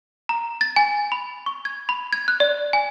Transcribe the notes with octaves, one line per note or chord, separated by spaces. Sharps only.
A#5
A6
G#5
B5
C#6
G#6
B5
G#6
F#6
D5
G#5